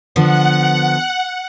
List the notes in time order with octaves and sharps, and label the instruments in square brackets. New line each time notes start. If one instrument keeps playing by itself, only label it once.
[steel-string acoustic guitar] D3 F3 B3 [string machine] F#5